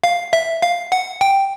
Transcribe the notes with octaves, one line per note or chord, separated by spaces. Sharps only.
F5
E5
F5
F#5
G5